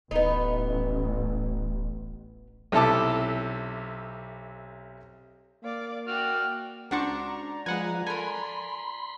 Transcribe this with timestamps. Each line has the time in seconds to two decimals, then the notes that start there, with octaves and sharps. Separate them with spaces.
0.11 D1 A1 B3 D#4
2.72 B1 C3 E4 A4 A5 D6
5.64 A#3 D5 F5
6.07 F#4 D5 G5 F6
6.91 C#2 D4 F#4 C5 D5 A#5 C#6 D6
7.66 F3 G#3 B4 F#5 G#5
8.07 A4 A#4 G#5 B5 C6